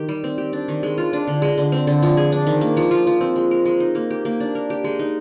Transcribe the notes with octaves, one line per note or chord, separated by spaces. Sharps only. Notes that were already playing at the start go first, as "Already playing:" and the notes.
Already playing: D#3 G4
G3
C4
G4
D4
D#3
G#3
F4
D4
D3
G#3
D3
C4
D3
F3
G#4
D4
D#3
A#3
F3
F4
F3
C4
G#3
A#4
G#3
D#4
A#3
G4
A#3
D4
A#4
G4
G#3
D#4